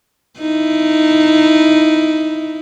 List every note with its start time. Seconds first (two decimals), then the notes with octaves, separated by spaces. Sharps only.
0.39 D#4 E4